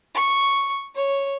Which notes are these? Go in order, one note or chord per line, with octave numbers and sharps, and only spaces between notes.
C#6
C#5